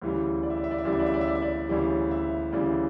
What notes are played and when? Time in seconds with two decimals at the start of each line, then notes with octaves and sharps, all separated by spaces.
0.02 D2 C#3 E3 G3
0.43 D5
0.50 E5
0.58 D5
0.64 E5
0.71 D5
0.78 E5
0.85 D2 C#3 E3 G3 D5
0.92 E5
0.99 D5
1.06 E5
1.14 D5
1.21 E5
1.28 D5
1.35 E5
1.42 D5
1.69 D2 C#3 E3 G3 D5
2.11 E5
2.53 D2 C#3 E3 G3 D5